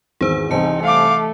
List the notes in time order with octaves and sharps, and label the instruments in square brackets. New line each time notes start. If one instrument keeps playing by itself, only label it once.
[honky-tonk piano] G#1 E2 D#3 [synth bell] G#4 C5 E6
[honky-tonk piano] C2 C4 G#5 [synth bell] E3 A5 C#7 [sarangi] D#4
[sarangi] A3 [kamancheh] F5 D6